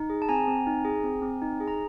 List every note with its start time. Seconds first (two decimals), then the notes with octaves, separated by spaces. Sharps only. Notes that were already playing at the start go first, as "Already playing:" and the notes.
Already playing: D#4
0.10 G#4
0.22 A5
0.29 C4 G#5 A#5
0.47 C4
0.67 D#4
0.85 G#4
1.04 C4
1.22 C4
1.42 D#4
1.60 G#4
1.68 A#5